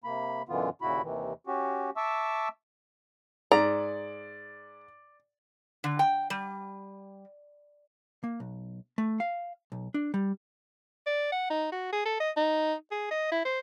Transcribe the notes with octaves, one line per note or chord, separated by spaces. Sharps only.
C3 A#3 B5
F#2 B2 D3 E3 B3 F4
D#2 A#2 C#3 E4 F#4 B5
D#2 C3 D#3 E3
C#4 F#4 G4
E5 A5 C#6 D6 E6
G#2 D5 A#5
D3
G5
G3
A#3
B1
A3
F5
B1
D4
G3
D5
F#5
D#4
F#4
G#4
A4
D#5
D#4
G#4
D#5
E4
C5